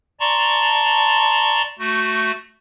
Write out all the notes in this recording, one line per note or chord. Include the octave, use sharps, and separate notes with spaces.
D5 A5 A#5 C6 C#6
A3 F#4